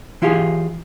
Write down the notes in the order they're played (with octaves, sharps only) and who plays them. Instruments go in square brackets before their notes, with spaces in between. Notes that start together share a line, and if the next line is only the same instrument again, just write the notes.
[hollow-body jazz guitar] E3 E4 F4 G4 G#4